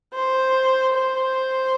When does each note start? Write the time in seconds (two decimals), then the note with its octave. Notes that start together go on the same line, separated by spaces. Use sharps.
0.14 C5
0.95 C5